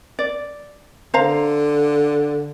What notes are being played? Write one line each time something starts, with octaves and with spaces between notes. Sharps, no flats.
D5
D3 C5 F5 A#5